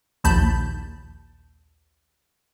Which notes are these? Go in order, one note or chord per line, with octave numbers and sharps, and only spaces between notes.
A#1 D#2 A5 B5 G6